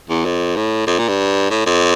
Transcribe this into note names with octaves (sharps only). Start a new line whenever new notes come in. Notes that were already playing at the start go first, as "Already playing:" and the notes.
E2
F2
A2
F2
A#2
G2
A2
F2